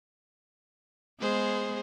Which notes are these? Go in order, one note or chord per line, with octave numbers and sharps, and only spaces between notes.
G#3 B3 G#4 C5